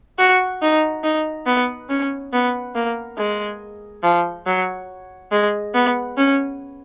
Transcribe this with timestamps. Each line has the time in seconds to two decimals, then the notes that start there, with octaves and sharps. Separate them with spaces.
0.18 F#4
0.62 D#4
1.04 D#4
1.46 B3
1.89 C#4
2.33 B3
2.75 A#3
3.18 G#3
4.03 F3
4.47 F#3
5.32 G#3
5.75 B3
6.17 C#4